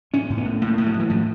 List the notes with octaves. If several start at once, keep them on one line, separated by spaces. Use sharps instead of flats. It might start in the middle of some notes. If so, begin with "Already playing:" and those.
A2 C#4
A2
B3
A2
A2 A#3
A2
F#3
A2
E3
A2 F3